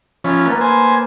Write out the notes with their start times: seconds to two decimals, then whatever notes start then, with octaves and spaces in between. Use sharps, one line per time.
0.24 F3 C#4 E4
0.45 A#3 B4 A5
0.61 C5 G#5